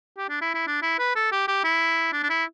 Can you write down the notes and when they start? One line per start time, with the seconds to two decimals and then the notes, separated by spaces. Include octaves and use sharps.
0.18 G4
0.29 D4
0.41 E4
0.54 E4
0.67 D4
0.82 E4
0.99 B4
1.16 A4
1.32 G4
1.48 G4
1.64 E4
2.13 D4
2.23 D4
2.30 E4